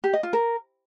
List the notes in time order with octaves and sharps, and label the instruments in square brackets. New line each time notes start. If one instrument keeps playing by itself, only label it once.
[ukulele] G4
D#5
F4
A#4